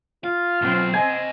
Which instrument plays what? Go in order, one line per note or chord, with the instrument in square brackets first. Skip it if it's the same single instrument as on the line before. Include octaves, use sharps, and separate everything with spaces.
[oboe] F4 [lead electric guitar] F5
[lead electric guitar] B2 F#3 [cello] C4
[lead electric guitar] C3 D#5 [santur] G#5